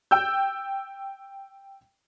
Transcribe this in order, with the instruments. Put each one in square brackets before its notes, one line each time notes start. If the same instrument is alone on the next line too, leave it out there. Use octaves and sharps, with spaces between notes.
[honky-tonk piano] G5 E6 G6